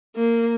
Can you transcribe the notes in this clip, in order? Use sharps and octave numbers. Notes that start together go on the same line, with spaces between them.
A#3